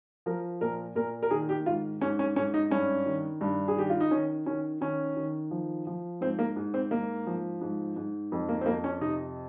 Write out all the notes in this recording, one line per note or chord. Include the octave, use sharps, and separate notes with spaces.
F3 A#4
A#2 A#4
A#2 A#4
A#4
D#3 G#4
G4
G#2 F4
G#2 C#4
C#4
G#2 C#4
D#4
G2 C#4
D#3
G2
G#4
D#3 G4
F4
D#4
D#3 C#4
D#3 C#4
D#3 C#4
D#3
F3
F3
G#2 C4
A#3
G#2
C4
G#2 A#3
F3
G#2
G#2
F2
A#3
C4
F2 A#3
C#4
C3 D#4